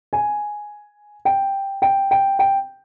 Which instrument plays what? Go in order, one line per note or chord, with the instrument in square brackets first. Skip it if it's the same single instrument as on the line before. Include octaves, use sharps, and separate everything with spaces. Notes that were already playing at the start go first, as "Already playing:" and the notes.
[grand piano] G#5
G5
G5
G5
G5